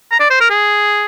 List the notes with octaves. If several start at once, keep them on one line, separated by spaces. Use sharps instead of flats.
A#5
D5
C5
A#4
G#4